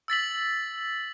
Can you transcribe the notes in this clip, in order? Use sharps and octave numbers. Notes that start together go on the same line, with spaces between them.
E6 A6 B6 F#7